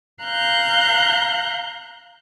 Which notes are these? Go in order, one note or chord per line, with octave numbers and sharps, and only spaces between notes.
F5 A#5 F#6 G6